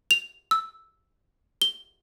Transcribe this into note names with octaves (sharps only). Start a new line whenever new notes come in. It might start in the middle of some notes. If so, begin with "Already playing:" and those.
F7
E6
G7